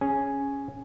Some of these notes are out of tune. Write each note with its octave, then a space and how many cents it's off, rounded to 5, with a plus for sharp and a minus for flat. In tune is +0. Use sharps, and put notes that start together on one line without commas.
C#4 +0 G#4 +0